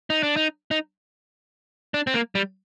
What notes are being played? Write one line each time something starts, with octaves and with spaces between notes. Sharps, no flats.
D#4
D4
D#4
D#4
D4
C4
A#3
G3